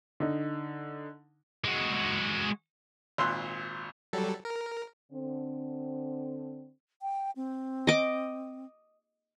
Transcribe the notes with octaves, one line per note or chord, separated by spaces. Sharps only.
D3 D#4
G#3 F#4
G#1 A#2 C6 E6 F#6
F#3 G3 A4
A#4
D3 C4
G5
C4
D#5 D6